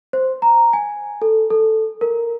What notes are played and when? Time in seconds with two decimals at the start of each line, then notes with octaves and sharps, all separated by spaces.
0.13 C5
0.42 A#5
0.73 G#5
1.22 A4
1.50 A4
2.01 A#4